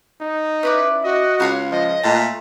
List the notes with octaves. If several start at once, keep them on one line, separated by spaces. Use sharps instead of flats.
D#4
C#4 E4 B4 D5
F#4 D#5
C#2 C#5 F5 F#5
F3 D#5
A#2 A3 A5